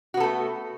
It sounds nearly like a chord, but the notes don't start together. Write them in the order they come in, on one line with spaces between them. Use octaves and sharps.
F#4 B3 A4 A3